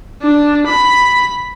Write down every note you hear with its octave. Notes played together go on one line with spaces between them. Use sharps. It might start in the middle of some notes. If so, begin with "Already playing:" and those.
D4
B5